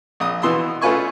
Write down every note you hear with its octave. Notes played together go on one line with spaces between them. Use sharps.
A#1 D#6
B2 E3 C6 D#6 E6
A3 C#4 F4 B4 G#5 C#6